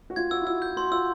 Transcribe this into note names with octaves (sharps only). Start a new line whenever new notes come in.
F#4
F4 G#6
F#4 E6
E4
F4 E6
G6
F#4 C6
F4 E6